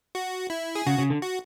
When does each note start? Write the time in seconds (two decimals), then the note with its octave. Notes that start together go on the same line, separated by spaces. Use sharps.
0.15 F#4
0.50 E4
0.75 G#4
0.86 C#3 F#4
0.98 C#3
1.10 D3
1.22 F#4